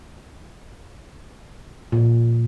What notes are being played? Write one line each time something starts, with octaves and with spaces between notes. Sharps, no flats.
A#2